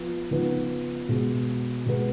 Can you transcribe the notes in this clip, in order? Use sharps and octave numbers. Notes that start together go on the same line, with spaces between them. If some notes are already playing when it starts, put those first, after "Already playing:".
Already playing: F3 B3
C#3 F3 B3 D#4
B2 G#3 B3
B2 G#3 B3